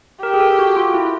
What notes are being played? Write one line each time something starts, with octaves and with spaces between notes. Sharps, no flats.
G4 A#4
G#4
A4
F#4
F4
E4